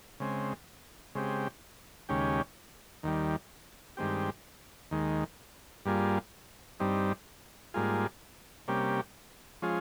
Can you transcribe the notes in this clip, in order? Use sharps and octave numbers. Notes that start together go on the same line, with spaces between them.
C#3 G#3 C4
C#3 G#3 C4 G4
D#2 C#3 G#3 C#4 G4
D#2 D#3 G3
G2 D#3 G#3 C4 G4
D#2 D#3 G#3
G2 G3 A#3 F4 G#4
G2 G3 C4 D#4
G#2 G3 A#3 F4 G#4
C3 G3 A#3 C#4 G4
F3 G#3 C#4 F4 G#4